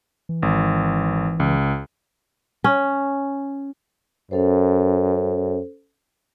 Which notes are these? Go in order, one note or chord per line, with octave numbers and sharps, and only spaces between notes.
E3
G#1
C#2
C#4
F#2 C#4 A4 C5